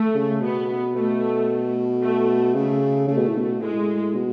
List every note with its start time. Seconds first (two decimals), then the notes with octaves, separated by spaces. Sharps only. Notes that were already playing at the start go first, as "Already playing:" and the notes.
Already playing: A3
0.15 C#3
0.42 B2 B3
0.95 B2 A3
2.02 A3
2.55 C#3 A3
3.08 C#3 A3
3.18 B2
3.27 A2
3.37 B2
3.61 A2 G#3
4.15 B2